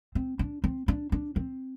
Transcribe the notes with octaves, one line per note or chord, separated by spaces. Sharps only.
C4
D4
C4
D4
D4
C4